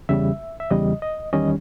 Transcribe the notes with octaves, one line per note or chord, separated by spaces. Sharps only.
E2 C#3 G3 E5
E5
E2 C#3 G3 D#5
D#5
E2 D#3 G3 C#4 D#5